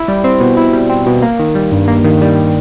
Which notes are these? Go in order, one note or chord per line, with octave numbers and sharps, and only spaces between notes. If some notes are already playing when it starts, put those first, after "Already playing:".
Already playing: E4
G3
C4
B2
E4
G3
C4
B2
A#3
D#3
G3
G2
A#3
D#3
G3